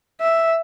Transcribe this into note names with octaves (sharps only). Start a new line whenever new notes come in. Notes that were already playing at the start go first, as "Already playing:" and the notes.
E5